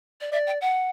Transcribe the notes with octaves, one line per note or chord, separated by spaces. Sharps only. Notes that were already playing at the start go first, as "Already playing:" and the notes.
D5
D5 E5
G5
F#5